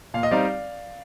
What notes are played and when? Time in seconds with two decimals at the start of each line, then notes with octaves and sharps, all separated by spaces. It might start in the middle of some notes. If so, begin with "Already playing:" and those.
0.14 A#2 F5
0.23 D#5
0.31 G3 C4 D#4 D5 F5